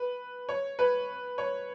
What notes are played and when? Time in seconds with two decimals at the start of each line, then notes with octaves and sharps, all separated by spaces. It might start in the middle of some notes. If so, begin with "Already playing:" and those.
Already playing: B4
0.49 C#5
0.79 B4
1.38 C#5